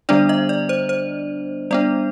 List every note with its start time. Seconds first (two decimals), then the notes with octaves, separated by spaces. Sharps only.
0.09 D3 G3 B3 D4 D5
0.29 D#5
0.49 D5
0.69 C5
0.89 C5
1.71 G3 B3 D4 D5